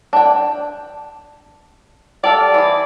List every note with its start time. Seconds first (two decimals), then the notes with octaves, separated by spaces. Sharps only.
0.13 D4 G5
2.24 G4 A4 D5 F5
2.54 E3 G#4